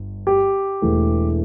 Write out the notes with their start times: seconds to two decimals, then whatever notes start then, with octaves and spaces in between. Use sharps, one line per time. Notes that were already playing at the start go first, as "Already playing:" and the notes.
Already playing: G1 G2
0.27 G4
0.82 E1 E2 E3 A3